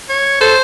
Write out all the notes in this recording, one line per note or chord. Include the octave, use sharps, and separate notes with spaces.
C#5
A4 C5